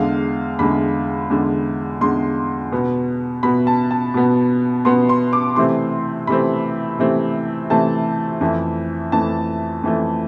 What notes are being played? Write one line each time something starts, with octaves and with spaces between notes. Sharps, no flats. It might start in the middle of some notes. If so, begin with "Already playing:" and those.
Already playing: E2 D3 G#3 F5
E2 D3 G#3 B5
E2 D3 G#3
E2 D3 G#3 C6
B2 B3
B2 B3 B5
A5
A5
B2 B3
B2 B3 C6
C6
D6
C3 E3 A3 C4 C6
C3 E3 A3 C4 B5
C3 E3 A3 C4
C3 E3 A3 C4 A5
F2 E3 A3
F2 E3 A3 A5
F2 E3 A3